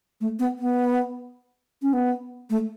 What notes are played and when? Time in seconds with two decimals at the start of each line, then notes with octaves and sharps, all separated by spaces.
0.21 A3
0.39 B3
0.59 B3
1.82 C#4
1.93 B3
2.50 A3